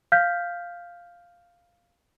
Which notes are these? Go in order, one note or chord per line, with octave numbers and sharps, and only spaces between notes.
F5 F6 G6 B6